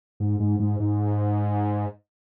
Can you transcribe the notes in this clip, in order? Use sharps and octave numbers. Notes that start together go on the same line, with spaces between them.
G#2
G#2
G#2
G#2